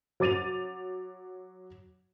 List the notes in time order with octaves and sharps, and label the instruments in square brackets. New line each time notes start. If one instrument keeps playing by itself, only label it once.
[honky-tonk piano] F#3 D6 A6 D#7 F7